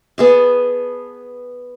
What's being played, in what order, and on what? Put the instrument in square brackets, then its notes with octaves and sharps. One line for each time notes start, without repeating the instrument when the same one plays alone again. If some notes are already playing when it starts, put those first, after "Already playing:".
[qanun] B3 G#4 A5